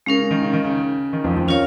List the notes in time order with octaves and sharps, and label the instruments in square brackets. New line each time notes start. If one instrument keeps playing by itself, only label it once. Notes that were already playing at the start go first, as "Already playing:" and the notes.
[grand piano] C#3 [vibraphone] G#3 C#4 A#4
[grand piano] C#3
D#3
C#3
D#3
C#3
D#3
F2 F3
F2 F3
[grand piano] D#3 [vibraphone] C#4 F4 A#4 C#5 F5